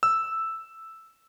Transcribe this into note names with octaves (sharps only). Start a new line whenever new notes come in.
E6